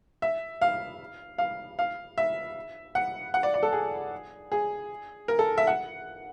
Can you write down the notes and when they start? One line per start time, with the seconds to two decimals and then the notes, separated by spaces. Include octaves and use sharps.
0.22 E5
0.62 F5
1.38 F5
1.79 F5
2.18 E5
2.95 F#5
3.34 F#5
3.43 D5
3.54 D5
3.63 A4
3.73 G#4
4.52 G#4
5.28 A#4
5.39 A4
5.58 E5
5.67 F#5